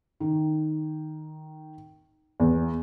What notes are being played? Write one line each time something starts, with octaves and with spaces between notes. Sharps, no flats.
D#3
E2